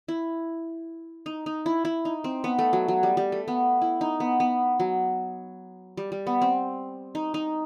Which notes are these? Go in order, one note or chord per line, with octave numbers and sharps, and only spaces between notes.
E4
D#4
D#4
E4
E4
D#4
C4
B3
A3
F#3
F#3
G3
G3
A3
B3
E4
D#4
B3
B3
F#3
G3
G3
B3
C4
D#4
D#4